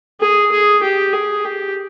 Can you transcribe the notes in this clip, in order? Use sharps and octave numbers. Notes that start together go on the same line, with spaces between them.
G#4
G#4
G4
G#4
G4